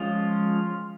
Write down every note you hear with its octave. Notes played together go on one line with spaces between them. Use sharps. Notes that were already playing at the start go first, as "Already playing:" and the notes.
Already playing: F3 G#3 C#4 F4